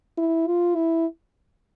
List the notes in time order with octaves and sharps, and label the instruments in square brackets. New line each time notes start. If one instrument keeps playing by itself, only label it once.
[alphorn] E4
F4
E4